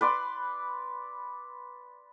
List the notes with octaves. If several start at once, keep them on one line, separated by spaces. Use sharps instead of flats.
B4 D5 C6